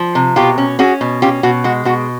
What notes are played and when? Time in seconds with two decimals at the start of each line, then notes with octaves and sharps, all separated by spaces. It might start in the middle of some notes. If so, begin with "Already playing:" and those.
Already playing: F3
0.15 C3
0.36 B2 F4 G4
0.58 C#4
0.79 C#4 F#4 G#4
1.01 B2
1.22 C#4 F4 G4
1.43 B2 F#4
1.64 G#3 F#4
1.85 B2 F#4